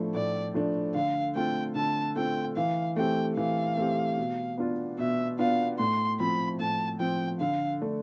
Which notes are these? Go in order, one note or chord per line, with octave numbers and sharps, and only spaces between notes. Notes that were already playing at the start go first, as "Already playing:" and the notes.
Already playing: A2 F3 A3 D4
A2 D5
F3 A3 D4
D3 F5
A3 C4 F4 G5
D3 A5
A3 C4 F4 G5
E3 F5
A3 C4 G4 G5
E3 F5
A3 C4 G4
B2
B3 D4 F4
B2 E5
B3 D4 F4 F5
A2 C6
F3 C4 B5
A2 A5
F3 C4 G5
D3 F5
A3 D4